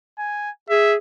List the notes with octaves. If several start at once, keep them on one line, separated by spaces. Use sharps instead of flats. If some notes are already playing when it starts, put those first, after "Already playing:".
G#5
G#4 E5